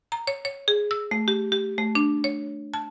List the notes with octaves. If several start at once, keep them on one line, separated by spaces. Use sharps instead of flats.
A#5
C#5
C#5
G#4
E6
A3
G4
G4
A3
D4
C#5
A5